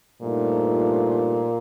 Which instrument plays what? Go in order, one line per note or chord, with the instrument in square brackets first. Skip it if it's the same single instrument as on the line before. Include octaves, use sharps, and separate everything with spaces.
[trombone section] G2 F3 A3 D#4 [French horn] A#2